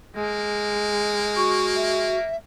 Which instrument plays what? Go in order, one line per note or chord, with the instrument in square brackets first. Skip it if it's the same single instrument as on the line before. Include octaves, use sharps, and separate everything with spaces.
[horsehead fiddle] G#3 [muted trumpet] A#3
[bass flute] F#4 [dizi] C#6
[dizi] E5